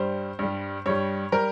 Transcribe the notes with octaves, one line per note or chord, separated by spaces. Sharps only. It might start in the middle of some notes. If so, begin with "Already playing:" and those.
Already playing: G2 G3 C5
G2 G3
G2 G3 C#5
G3 A#4